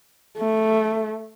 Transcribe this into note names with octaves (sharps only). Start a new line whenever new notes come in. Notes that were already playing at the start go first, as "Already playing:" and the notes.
A3